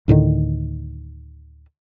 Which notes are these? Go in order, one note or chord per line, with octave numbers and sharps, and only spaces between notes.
D2 A2 D3 D#3